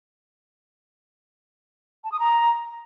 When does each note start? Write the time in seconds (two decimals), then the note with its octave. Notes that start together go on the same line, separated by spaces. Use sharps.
2.04 A5
2.12 D#6
2.20 A#5